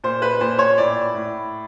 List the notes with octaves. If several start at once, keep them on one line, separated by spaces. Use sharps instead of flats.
A#2 C5
B4
A#2 C5
C#5
A2 D5
A2